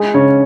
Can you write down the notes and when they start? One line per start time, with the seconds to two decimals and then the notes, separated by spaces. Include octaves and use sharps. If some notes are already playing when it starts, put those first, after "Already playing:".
Already playing: G#3
0.14 C#3 C#5